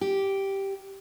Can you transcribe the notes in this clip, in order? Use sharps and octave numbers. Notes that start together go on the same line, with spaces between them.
G4